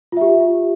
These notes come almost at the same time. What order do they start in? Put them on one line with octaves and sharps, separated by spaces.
F4 E5 G4